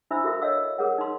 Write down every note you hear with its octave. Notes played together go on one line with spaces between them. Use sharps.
D4 E4 C5 E5 B5 E6
F#4 A4 A#4 E5 F5
C#5 D#5 F5 E6
G#4 A#4 B4 C#5 F#5
D#4 C6